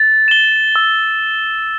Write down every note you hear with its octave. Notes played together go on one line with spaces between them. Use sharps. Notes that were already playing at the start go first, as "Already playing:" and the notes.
Already playing: A6
E7 G7
E6